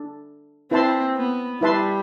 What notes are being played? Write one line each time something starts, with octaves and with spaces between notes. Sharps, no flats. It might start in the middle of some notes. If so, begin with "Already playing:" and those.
Already playing: D4 A4
C4 E4 B4 E5 A5 C6
B3
G3 E4 B4 E5 A5 C6